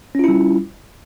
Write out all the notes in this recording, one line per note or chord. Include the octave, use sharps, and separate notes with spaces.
G3 C#4 E4 F4